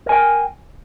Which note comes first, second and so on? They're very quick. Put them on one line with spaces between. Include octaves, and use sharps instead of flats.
A#4 G#5 G5